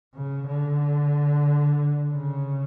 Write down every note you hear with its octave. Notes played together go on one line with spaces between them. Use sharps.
C#3
D3
C#3